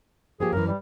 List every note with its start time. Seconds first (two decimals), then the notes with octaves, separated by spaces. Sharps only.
0.40 F3 A#3 G4 G#4
0.53 F#2 E3 A#4
0.67 G3